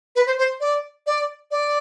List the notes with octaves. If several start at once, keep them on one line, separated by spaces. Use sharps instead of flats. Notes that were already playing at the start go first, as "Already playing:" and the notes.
B4
C5
C5
D5
D5
D5